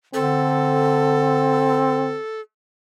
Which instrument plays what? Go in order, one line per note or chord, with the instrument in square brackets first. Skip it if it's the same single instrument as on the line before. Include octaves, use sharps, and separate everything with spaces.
[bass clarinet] D3 [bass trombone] C4 [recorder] A4